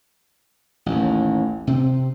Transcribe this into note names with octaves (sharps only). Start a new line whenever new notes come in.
A1 D#2
C3 C4